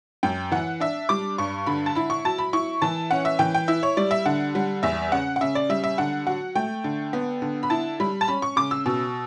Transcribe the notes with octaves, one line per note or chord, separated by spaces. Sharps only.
F#2 G5
E3 F#5
D4 E5
G3 D6
G2 C#6
D3 B5
A5
E4 B5
C#6
F#3 A5
B5
E4 C#6
E3 A5
C#4 F#5
E5
E3 G5
G5
E4 E5
C#5
G3 D5
E5
D3 F#5
G3
E2 E5
C#3 F#5
F#5
C#3 E5
D5
G3 E5
E5
D3 F#5
F#3 F#5
A3 G5
D3
B3
D3
B5
E4 A5
G3 B5
A5
C#4 B5
C#6
C#3 D6
E6
B2